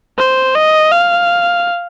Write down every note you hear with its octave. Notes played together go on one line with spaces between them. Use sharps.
C5
D#5
F5